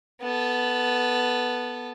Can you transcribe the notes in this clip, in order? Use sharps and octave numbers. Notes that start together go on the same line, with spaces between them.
B3 A4